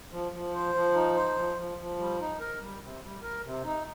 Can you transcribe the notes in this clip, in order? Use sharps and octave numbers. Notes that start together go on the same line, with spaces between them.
F3
F3
C5
F3
D#4
C5
F3
F3
F3
G3
D#4
A#4
G3
C3
G3
A#4
C3
D#4